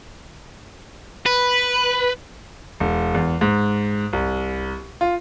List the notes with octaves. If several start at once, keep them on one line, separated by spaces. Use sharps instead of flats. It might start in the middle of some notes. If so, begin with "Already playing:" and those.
B4
E1
E2
G#2
C2
F4